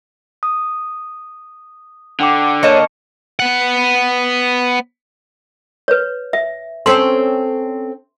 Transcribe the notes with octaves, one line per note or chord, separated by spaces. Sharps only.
D#6
D3 F#5 G5 D6
A#3 C#5 D#5 A5 C#6 C#7
B3 F#5
B4 C#5
E5
C4 C#4 A4 C6